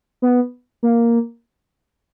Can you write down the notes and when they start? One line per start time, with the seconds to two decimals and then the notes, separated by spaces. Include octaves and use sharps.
0.22 B3
0.83 A#3